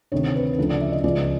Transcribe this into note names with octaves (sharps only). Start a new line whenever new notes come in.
D2 C3 D#3 C#5
C5
B4
D2 C#3 F3
D5
E5
D#5
C#2 C#3 F3 D5